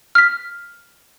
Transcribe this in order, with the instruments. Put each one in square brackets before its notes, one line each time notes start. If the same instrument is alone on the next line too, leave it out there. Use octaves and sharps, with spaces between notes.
[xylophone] F6 B6